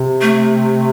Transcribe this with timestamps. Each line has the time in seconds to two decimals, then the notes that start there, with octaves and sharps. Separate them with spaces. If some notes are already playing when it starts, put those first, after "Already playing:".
Already playing: C3
0.22 A3